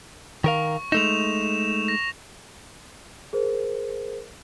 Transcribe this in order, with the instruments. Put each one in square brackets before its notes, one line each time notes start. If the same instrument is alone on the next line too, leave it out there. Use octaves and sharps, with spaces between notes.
[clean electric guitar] D#3 A#4 F5 [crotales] C#6
[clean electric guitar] G#3 A3 D#4 [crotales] E7 F7
[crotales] A#6
[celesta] G#4 A#4 C5